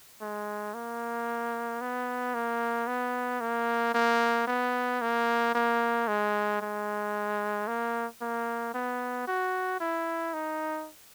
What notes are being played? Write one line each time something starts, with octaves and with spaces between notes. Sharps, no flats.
G#3
A#3
B3
A#3
B3
A#3
A#3
B3
A#3
A#3
G#3
G#3
A#3
A#3
B3
F#4
E4
D#4